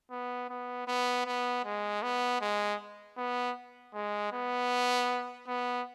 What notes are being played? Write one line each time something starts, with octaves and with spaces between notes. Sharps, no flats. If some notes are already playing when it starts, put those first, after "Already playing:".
B3
B3
B3
B3
G#3
B3
G#3
B3
G#3
B3
B3